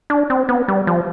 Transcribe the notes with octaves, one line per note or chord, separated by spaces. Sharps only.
D4
C4
B3
G3
F3